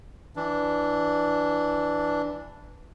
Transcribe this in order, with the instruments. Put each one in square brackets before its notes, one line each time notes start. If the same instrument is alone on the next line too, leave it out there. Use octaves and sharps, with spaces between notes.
[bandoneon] E3 D4